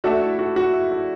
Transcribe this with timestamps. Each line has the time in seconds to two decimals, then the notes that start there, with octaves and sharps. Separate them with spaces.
0.04 A3 D4 F#4 A4 E5
0.21 E4
0.39 F#4
0.56 F#4
0.73 E4
0.91 E4